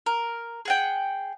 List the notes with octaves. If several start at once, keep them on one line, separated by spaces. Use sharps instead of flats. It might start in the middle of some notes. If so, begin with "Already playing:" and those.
A#4
G#4 F#5 G5